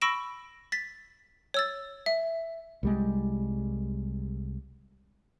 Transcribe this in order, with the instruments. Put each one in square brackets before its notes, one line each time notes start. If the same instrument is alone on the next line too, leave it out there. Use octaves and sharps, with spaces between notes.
[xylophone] B5 C#6 E6 A#6 D7 E7
A6 B6
C#5 E6 A6
E5
[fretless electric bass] C2 G3 G#3